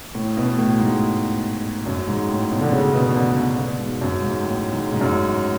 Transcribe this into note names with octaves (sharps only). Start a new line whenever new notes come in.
A2
B2
A2
G#2
F#2
G#2
A2
B2
D3
C#3
B2
D3
B2
B2
G#2
F#2
G#2
A2
G#2
G#2
F#2